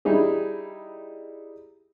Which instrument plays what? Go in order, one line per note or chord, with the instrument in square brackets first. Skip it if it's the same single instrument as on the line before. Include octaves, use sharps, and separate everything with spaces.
[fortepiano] G3 D#4 E4 G#4